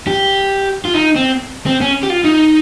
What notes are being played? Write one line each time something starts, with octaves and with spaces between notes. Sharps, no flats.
G4
F4
D#4
C4
C4
C#4
G4
F4
D#4